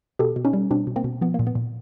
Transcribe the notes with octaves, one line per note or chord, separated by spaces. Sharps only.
B2 G4 A4
B2
C#4 D#4
G3
B2 C4 D4
B2
A#3 C4
B2
F3 B3
A#3
A#2
B3
A#2